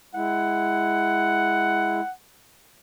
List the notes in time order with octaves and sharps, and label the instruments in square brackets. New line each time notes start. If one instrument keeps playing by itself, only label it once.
[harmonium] G#3 E4 [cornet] F#5